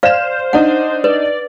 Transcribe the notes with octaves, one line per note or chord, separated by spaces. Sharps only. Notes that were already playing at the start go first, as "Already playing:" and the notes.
C5 D5 F5 F6 E7
D4 D#4 F#5
B4 D5